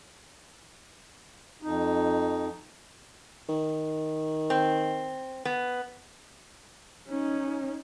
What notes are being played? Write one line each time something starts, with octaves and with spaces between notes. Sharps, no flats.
F2 D#4
D#3
C4
B3
C#4 D#4